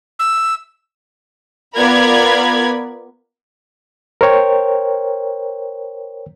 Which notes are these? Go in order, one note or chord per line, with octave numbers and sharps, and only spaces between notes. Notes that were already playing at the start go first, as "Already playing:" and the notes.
E6
B3 F4 A#4 D5 B5 G#6
A#4 C5 C#5 G5